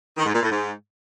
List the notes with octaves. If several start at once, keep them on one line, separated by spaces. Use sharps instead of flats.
D#3
G#2
A#2
A2
G#2